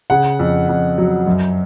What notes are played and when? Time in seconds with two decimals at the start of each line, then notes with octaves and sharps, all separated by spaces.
0.10 C#3 F#5
0.39 F2
0.69 F2
0.98 F#3
1.27 F#2